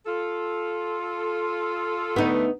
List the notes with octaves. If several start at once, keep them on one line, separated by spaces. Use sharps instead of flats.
F4 A4
D3 A3 B3 D#4